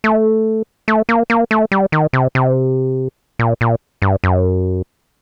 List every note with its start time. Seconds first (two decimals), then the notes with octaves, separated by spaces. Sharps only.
0.04 A3
0.88 A3
1.09 A#3
1.30 A#3
1.51 A3
1.72 G3
1.92 D#3
2.13 C3
2.35 C3
3.39 A#2
3.61 A#2
4.02 G2
4.24 F#2